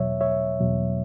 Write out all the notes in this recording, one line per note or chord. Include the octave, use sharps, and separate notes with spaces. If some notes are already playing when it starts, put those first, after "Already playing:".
Already playing: E2 B2 F#3 C#5 E5
C#5 E5
E2 B2 F#3